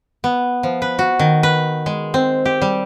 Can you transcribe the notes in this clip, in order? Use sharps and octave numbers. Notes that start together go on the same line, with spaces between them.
B3
F3
B4
F#4
D#3
B4
G#3
C4
G4
G3